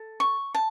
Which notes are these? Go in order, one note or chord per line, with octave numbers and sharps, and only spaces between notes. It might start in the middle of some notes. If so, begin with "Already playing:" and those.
Already playing: A4
C#6
A5